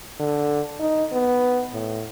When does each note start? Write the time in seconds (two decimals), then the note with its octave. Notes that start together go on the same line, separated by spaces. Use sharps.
0.19 D3
0.80 D#4
1.12 B3
1.73 A2